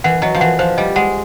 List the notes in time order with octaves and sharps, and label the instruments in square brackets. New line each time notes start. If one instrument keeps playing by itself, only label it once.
[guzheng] E3 [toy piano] F#5
[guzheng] F#3 [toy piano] D#5
[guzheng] F3
[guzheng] E3 [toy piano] F#5
[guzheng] F3 [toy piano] C5
[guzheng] G3 [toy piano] D#5
[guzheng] G#3 [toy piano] F#5